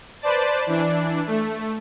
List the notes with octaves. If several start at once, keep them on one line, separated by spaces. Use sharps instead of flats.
B4 C5 D5 A5
E3 D4
A3